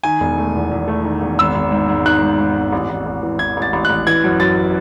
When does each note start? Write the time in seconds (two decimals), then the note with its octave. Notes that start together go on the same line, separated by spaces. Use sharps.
0.03 D#3 G#5
0.20 E1
0.38 A3
0.55 E2
0.71 E2
0.88 A3
1.04 D#3
1.21 E1
1.39 G#1 E6
1.55 G#1
1.72 G#2
1.89 G#2
2.05 D#3 F#6
2.23 G#2
2.39 G#2
2.55 G#1
2.72 A1
2.90 A1
3.06 A1
3.23 E3
3.39 E3 G#6
3.57 A1 A6
3.73 A1
3.85 F#6
3.90 A1
4.07 E3 G#6
4.24 F#2
4.40 F#2 A6